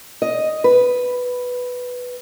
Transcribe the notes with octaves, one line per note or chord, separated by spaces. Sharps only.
D#5
B4